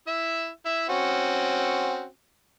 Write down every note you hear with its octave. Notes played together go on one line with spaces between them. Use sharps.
E4 E5
E4 E5
C4 C#4 F#4